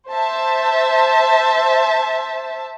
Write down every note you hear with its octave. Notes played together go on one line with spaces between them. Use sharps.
C5 E5 A5